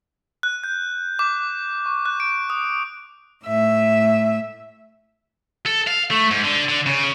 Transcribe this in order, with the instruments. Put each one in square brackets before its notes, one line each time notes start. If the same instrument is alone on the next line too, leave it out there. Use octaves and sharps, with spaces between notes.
[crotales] F#6
G6
D6
C#6
F#6
D7
D#6
[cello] A2 E5
[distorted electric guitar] A4
F5
A3
G#2
D3
D3
C#3